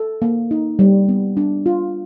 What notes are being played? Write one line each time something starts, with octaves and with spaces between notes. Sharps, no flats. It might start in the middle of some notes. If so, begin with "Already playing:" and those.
Already playing: A4
A#3
D#4
G3
B3
D4
F4